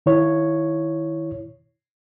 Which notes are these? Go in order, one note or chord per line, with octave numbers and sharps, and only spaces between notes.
D#3 E4 C#5